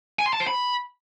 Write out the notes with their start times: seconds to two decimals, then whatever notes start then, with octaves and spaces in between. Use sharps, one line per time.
0.19 G#5
0.26 C6
0.33 A5
0.40 C5
0.47 B5